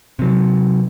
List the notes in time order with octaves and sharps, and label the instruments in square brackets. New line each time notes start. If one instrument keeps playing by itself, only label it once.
[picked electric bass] C3 F#3